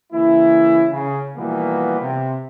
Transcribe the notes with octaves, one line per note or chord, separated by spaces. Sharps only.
C#3 E3 A#3 E4
C#3
B2 E3 F3 G3 A#3 B3
C3